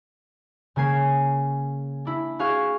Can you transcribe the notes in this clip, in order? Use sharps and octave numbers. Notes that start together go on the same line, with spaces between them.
C#3 A#3 G#5 C7
D4 E4
F#4 G#4 F5 C#6